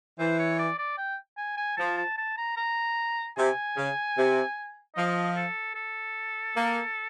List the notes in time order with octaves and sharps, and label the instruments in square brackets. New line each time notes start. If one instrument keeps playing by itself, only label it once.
[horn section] E3 [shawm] C5
[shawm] C#5
D5
D5
G5
G#5
G#5
[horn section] F3 [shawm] A5
[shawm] A5
A5
A#5
A#5
[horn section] C3 [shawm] G#5
[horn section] C#3
C3
[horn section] F3 [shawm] D#5
[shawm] A4
A4
[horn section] A#3